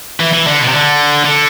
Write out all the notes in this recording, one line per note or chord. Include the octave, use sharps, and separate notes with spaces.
E3
E3
D3
B2
C3
D3
D3